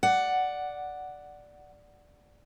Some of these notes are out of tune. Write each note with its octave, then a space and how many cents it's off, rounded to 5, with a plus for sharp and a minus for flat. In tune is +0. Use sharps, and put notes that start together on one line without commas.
D5 +0 F#5 +0